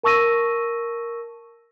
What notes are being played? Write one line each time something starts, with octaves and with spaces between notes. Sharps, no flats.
A#4 A5 C#6 E6 A#6 D#7